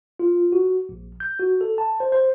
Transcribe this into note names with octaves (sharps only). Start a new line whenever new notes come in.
F4
F#4
A#1
G6
F#4
A4
A5
C5
C5